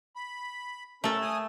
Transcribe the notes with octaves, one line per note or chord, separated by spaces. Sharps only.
B5
A3 C#4 A4 A#4
G#5 D#6